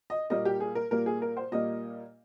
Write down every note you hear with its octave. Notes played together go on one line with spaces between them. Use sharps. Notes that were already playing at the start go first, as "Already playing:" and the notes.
D#5
A#2 G3 A#3 D#5
G4
G#4
A#4
A#2 G3 A#3 A#4
G#4
A#4
C5
A#2 G3 A#3 D#5